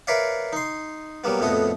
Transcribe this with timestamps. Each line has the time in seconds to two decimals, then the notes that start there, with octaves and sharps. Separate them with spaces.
0.07 A#4 B4 C#5 D5 E5 F5
0.53 D#4 C6
1.24 F#3 G3 A#3 B3
1.39 A#1 F2 A2 B3 F#4 D#5